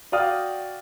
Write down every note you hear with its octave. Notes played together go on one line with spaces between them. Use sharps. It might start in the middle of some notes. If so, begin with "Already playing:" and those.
F#4 D5 F5 G5 D#6 F6